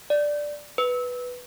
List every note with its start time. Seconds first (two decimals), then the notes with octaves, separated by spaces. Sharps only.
0.10 D5
0.78 B4